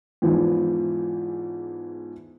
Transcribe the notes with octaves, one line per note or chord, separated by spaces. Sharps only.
E2 G#2 E3 F3